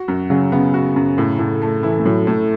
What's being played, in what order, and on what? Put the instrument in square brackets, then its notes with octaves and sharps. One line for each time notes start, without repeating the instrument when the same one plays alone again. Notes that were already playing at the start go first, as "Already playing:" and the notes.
Already playing: [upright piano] F#4
F#2
[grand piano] C#3 [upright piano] F#3
[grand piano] C#3 [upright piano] B3
[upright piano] F#4
F#2
A2
A2
A3
[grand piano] E3 [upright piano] E4
[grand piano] A3
[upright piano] A2 [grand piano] F#3
[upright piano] A2 [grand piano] A3